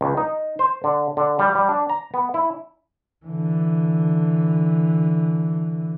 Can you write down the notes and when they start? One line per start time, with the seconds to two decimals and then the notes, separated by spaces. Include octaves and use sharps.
0.01 C#2
0.17 D#4
0.59 C5
0.84 D3
1.17 D3
1.39 G3
1.55 G3
1.69 D4
1.89 A#5
2.14 B3
2.34 E4
3.26 D3 E3